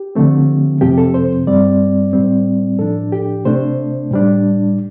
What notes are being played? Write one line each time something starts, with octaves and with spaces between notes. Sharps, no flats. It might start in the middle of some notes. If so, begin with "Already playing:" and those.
Already playing: G4
D3 F3 A3 C4
F2 C3 F3 C4 G4
A4
C5
G2 G3 C4 D5
A2 G3 C4
A2 F3 D4 A4
G4
C3 A3 D4 C5
A2 G3 D4